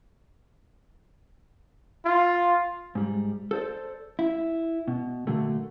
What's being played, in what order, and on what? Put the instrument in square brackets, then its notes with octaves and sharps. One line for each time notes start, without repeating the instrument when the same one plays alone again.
[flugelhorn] F4
[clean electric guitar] G#2 G3
A4 C5 D5
E4
B2
A#2 D3 F#3 A3